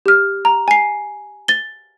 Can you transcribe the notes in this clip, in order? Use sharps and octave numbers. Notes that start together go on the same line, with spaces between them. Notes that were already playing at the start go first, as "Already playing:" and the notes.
G4 F6
A#5
G#5 C7
A6 G7